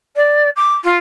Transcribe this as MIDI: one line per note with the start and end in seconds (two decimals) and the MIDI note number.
0.16 0.49 74
0.56 0.73 86
0.83 0.96 65